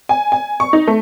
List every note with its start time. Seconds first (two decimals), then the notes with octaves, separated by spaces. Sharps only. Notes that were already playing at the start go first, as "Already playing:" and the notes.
0.09 G#5
0.32 G#5
0.60 C#6
0.73 D#4
0.87 A3